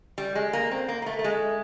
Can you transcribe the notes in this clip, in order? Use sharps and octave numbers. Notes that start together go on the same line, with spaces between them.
G3
G#3
A#3
C4
A#3
A#3
A3
A3
G#3